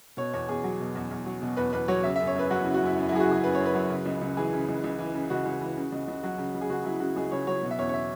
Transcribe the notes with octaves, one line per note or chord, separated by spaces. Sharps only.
B2 C#5
E2 C#5
E2 G#4
F#3
B2
E2
E2
F#3
B2
E2 B4
E2 B4
F#3 C#5
C#3 E5
E5
F#2
C#5
F#2 B4
F#3 F#4
E4
C#3
F#4
F#2 E4
F#2
E4
F#3 G#4
F#4
C#3 G#4
F#2 B4
F#2 C#5
B4
F#3
C#3
C#2
C#2
E3 G#4
C#3
C#2
C#2
E3
C#3
C#2 F#4
C#2
E3
C#3
C#2
C#2
F#3 F#4
C#3
C#2
G#4
C#2 F#4
F#3 E4
C#3 F#4
C#2 G#4
C#2 C#5
F#3 C#5
B2
E5
E2 C#5
C#5
E5